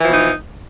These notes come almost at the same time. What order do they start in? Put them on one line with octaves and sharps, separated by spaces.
E3 F3 B2 D#4